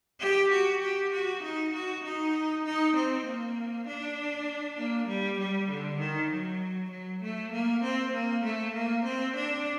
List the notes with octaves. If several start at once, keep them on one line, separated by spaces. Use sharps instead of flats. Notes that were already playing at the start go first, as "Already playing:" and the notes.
G4
F#4
G4
F#4
D#4
F#4
D#4
D#4
C4
A#3
D4
A#3
G3
G3
D3
D#3
F#3
F#3
A3
A#3
C4
A#3
A3
A#3
C4
D4